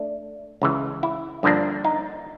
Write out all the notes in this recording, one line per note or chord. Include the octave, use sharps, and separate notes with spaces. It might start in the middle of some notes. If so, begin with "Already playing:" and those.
Already playing: A3 D4
C#2 C#3 E3
E4
G2 D3 F3 A#3 D4
D#4